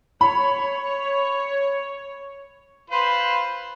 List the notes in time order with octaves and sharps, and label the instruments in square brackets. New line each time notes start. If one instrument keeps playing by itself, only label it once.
[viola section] C#5 [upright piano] B5
[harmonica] F4 B4 C5